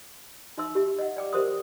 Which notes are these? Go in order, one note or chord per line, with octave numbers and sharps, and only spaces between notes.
D#4 E5 C6 E6
G4 E5
D#5 F#5
D5 G5 D6
G4 A#4 C5 E5 C6 D#6